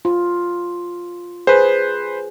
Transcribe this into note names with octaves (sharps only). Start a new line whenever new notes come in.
F4
G#4 B4 C5